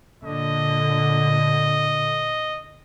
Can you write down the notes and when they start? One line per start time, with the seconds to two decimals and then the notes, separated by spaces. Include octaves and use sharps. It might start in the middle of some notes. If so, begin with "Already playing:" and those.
0.23 A#2 D3 D#5